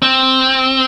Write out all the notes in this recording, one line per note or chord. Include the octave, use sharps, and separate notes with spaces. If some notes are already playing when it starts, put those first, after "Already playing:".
C4